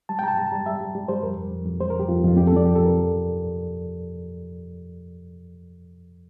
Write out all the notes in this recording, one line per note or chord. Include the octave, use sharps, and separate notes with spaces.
G3 A5
G5
G3 A5 A#5
G3 A#5
A5
G3
G3 E5
G3
G3
G3 C5
F2 A#4
F2
F2
F2
G3 C5
A#4
F2 G4
F2 F4
F2 F4
F2 G4
A4
F2 D5
F2 G4
A4
F2 A#4
F3